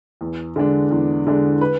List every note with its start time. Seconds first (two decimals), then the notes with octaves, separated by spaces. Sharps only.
0.21 E2
0.56 D3 G#3 D4
0.91 E2
1.27 D3 G#3 D4
1.61 B4